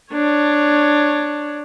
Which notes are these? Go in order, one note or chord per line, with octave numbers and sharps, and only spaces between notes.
D4 C#5